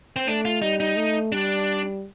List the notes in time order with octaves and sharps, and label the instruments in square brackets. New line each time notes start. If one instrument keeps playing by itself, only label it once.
[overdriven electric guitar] C4
[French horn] A3 [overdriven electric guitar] D4
[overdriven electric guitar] F4
[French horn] G3 [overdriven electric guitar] D#4
[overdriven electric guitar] D#4
[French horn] A3
[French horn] G3 [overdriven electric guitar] D4